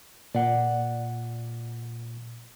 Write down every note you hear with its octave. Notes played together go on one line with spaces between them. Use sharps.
A#2 D5 F#5